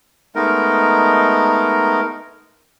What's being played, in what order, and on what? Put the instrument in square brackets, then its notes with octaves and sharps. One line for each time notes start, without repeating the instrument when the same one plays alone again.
[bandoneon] G#3 A3 B3 D#4 A#4